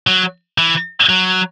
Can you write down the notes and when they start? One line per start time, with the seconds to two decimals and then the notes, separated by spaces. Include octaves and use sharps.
0.07 F#3
0.58 E3
1.09 F#3